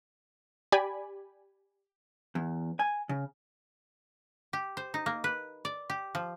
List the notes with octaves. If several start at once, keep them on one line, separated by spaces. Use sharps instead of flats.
G4 D5 G#5 B5
E2
G#5
C#3
G4
C5
D#4
A#3
B4
D5
G4
F3